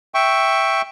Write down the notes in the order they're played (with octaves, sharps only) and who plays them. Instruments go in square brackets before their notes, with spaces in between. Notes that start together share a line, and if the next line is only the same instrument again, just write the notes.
[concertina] E5 G5 C#6